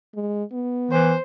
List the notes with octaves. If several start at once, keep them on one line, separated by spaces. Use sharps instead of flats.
G#3
B3
E3 C5